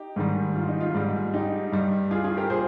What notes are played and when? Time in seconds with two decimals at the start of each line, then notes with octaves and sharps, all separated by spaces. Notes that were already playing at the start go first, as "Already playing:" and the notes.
Already playing: D#4 G4
0.16 G#2 D#3 G3
0.56 F4
0.68 D#4
0.81 F4
0.94 G#2 G3
1.33 D#4 G4
1.72 G2 G3
2.11 F4 G#4
2.24 F4 G#4
2.37 G4 A#4
2.50 A#2 G#4 C5